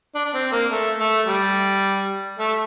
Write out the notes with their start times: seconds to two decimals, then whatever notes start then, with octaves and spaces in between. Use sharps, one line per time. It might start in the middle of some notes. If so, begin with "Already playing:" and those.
0.15 D4
0.25 D4
0.34 C4
0.52 A#3
0.71 A3
1.00 A3
1.27 G3
2.39 A3